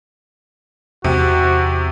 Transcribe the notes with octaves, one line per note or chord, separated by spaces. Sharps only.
E2 C3 F#4